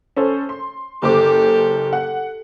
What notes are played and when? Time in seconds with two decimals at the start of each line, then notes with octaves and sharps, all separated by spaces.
0.16 C#4 A4 C5
0.49 C6
1.02 F#1 G4 A4 C5 D6
1.93 F#5